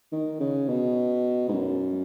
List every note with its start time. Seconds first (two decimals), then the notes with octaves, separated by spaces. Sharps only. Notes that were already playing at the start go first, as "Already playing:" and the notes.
0.12 D#3
0.40 C#3
0.69 B2
1.48 G#2
1.53 F#2